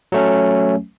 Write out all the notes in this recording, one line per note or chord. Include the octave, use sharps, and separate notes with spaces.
F#3 A3 C#4